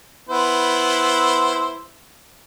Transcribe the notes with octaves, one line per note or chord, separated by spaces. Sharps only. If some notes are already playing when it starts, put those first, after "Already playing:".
B3 E4 C5